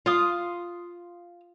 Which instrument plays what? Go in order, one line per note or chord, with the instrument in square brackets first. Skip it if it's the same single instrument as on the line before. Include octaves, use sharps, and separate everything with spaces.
[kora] F4 [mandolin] F5 C6 D#6